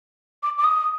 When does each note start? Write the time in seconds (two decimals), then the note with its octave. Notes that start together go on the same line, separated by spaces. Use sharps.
0.43 D6
0.58 D6
0.64 D#6